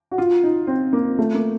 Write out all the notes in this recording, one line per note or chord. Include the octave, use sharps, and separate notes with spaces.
F#4
F4
D#4
C4
A#3
A3
A#3